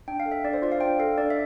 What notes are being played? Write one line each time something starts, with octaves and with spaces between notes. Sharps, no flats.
D4 G5
F5
A4
E5
D4 D5
C5
F4 D5
F5
D4 G5
A4 F5
D4 D5
E5